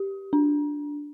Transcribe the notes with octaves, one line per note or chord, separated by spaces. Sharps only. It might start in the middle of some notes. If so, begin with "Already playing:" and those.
Already playing: G4
D4